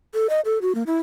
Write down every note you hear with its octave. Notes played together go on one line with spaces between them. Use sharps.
A4
D#5
A4
F#4
A#3
E4